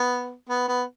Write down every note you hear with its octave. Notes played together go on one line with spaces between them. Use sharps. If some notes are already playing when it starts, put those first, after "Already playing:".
Already playing: B3
B3
B3